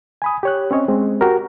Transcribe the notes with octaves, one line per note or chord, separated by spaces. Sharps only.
G#5 B5 D#6
G4 C#5 F#6
C4 C#4 C#5 D#5
G#3 C4
F#4 G4 A#4